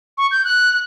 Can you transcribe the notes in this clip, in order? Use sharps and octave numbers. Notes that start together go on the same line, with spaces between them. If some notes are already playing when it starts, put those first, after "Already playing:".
C#6
G6
F#6